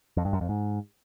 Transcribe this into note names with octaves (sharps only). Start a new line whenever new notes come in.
F2
G2
F#2
F2
G#2